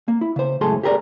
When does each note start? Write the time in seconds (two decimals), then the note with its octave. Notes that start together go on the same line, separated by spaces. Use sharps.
0.08 A#3
0.21 E4
0.36 C#3 C5
0.61 C#2 F#2 A2 G#4 A4 C6
0.83 G4 G#4 A#4 B4 D5